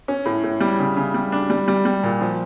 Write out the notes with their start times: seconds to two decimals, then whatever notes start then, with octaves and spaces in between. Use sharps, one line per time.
0.08 C#4
0.25 A2
0.43 A2
0.60 G3
0.79 C#3
0.97 C#3
1.14 G3
1.32 D4
1.50 G3
1.68 G3
1.85 G3
2.03 A#2
2.21 F3